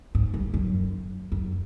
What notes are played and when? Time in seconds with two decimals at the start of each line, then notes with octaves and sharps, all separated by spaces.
0.15 G#2
0.34 G2
0.54 F#2
1.32 F#2